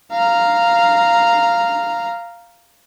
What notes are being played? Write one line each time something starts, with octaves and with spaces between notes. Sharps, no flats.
F5 A#5